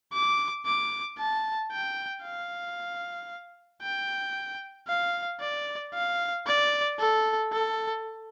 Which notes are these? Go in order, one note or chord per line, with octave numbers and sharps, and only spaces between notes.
D6
D6
A5
G5
F5
G5
F5
D5
F5
D5
A4
A4